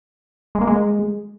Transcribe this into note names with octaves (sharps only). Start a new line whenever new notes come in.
G#3
A#3
G#3